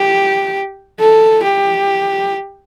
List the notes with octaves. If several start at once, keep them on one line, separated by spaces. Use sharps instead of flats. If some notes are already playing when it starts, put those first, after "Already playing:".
Already playing: G4
A4
G4